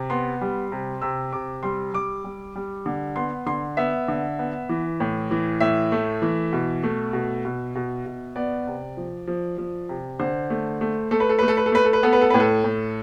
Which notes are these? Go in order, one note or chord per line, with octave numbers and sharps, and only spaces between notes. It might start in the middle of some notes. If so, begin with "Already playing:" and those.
Already playing: C3
B3 C6
G3
C3
C3 E6
C3 D6
G3 C6
G3 D6
G3
G3
D3
B3 C6
D3 C6
B3 E5
D3
B3
E3
A2
E3
A2 E5
A3
E3
B2
A3
B2
B2
B2
B2
B3 D5
C3
F3
F3
F3
C3
D3 C5
A3
A3
A3 A4
B4
A4
A3 B4
A4
B4
A4
A3 B4
A4
B4
B3 A4
B4
A4
A2 B4
A4
A2